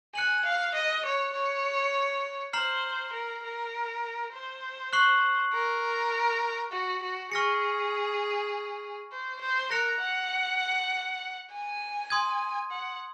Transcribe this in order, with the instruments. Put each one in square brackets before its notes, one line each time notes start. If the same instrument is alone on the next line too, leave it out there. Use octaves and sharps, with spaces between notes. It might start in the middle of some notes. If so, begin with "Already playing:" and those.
[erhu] G#5 [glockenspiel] F#6 C#7 F#7
[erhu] F5
D#5
C#5
C#5
[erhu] C5 [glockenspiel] A#5 F6 C7 F#7
[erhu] A#4
A#4
C5
[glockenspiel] C#6 F#6 C7 F#7
[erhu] A#4
F#4
F#4
[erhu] G#4 [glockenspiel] C#6 F6 A#6 C#7
[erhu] C5
C5
[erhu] A#4 [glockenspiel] F#6 A#6 C#7 F7
[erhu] F#5
G#5
[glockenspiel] C6 D#6 G#6
[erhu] F#5